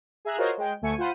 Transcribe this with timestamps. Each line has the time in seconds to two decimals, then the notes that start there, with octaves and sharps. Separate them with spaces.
0.25 G#4 E5 A#5 F#6
0.37 F4 F#4 A#4 C5 C#5 D#5
0.57 G#3 G5
0.82 D2 A3 G#5 C#6 C#7
0.98 F4 C5 F#5 B5 D#7